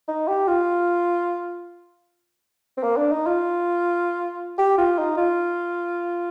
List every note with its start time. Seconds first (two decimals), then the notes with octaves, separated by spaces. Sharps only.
0.08 D#4
0.28 G4
0.48 F4
2.78 C4
2.83 A#3
2.97 D4
3.12 D#4
3.26 F4
4.58 G4
4.78 F4
4.99 D#4
5.17 F4